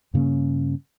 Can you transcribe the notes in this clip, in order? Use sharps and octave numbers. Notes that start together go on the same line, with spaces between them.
G2 C#3 A#3 C#4